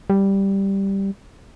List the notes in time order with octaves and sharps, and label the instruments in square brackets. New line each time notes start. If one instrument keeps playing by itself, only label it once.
[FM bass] G3